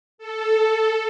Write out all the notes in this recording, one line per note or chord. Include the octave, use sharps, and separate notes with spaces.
A4